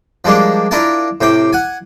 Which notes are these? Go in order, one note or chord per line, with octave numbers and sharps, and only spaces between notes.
F3 G3 G#3 A#3 D4
D4 E4 F4 A#4 F5 A5
A2 C3 G5 D6
F#5 G#5